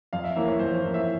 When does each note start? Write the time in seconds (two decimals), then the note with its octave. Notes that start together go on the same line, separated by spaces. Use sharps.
0.13 F2 F5
0.24 E5
0.36 E3 A#3 C#4 E5
0.47 C#5
0.59 F2 C5
0.71 C#5
0.82 E3 A#3 C#4
0.94 E5